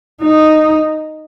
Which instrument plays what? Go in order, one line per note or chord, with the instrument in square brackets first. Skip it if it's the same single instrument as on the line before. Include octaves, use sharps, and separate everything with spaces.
[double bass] D#4